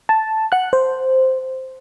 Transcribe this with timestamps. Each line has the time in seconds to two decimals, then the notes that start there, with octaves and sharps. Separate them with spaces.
0.09 A5
0.52 F#5 F#6
0.73 C5